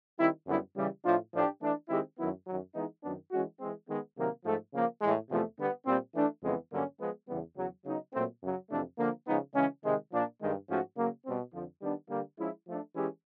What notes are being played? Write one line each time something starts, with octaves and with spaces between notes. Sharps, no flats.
D#3 G3 C4 E4
F#2 D3 G3 B3 E4
C#3 E3 G3
A2 F3 A3 D4 F4
A2 F3 A3 D4 G4
E3 A3 D4
D#3 G#3 C4 E4 G4
F#2 D#3 F#3 B3 E4
F#2 D#3 F#3
E3 G#3 B3 D#4
F#2 D#3 F#3 B3 D4
E3 G#3 C#4 F#4
E3 G#3 C4
D#3 G#3 B3
C3 D#3 F#3 A#3
G#2 F3 A3
C#3 F3 A#3
A2 E3 G#3
E2 C3 F3 A3
D3 G3 B3
A#2 G3 C4
E3 A3 D4
F2 C#3 E3 G#3 B3
G2 D3 F#3 A#3 C#4
F3 G#3 B3
E2 C#3 E3 G3 B3
E2 C#3 F#3
C#3 F#3 B3 D#4
A#2 F#3 A3 C4
F#2 C#3 F#3
F2 C3 E3 A3 D4
D3 F3 A#3
C#3 F3 G#3 B3 D#4
C#3 E3 G#3 C#4
C3 D#3 G#3
A#2 F3 A#3 D4
G2 D#3 G#3
G#2 F3 A3 C#4 F#4
C#3 F#3 A#3
B2 G3 C4
F2 D3 F3
D#3 G3 B3 D4
D3 G3 A#3
F3 G#3 C#4 E4
F3 A3 D4
E3 G#3 C#4 E4 G4